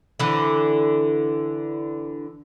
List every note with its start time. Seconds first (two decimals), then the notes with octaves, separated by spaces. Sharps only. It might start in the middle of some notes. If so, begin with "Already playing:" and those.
0.19 D3 E3